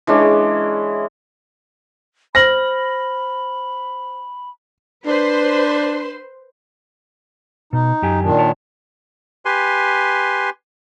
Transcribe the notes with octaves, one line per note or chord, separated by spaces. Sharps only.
E3 G#3 C#4 D4
C5 B5 F6 A#6 F#7
D4 B4 C5 C6
B2 D#4
F#2 G4 G#5
A#2 D#3 D4
C#5 A5
G4 B4 G#5 C6